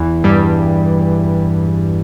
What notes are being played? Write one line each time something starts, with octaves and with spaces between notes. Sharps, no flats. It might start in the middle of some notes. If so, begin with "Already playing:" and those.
Already playing: E2 E3
G2 G3